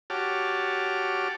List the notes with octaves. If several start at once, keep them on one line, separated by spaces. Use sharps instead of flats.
F#4 G4 C#5 A5 D6 F6